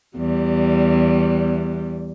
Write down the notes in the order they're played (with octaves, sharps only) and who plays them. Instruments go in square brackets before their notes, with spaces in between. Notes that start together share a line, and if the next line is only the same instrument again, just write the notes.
[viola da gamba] E2 G3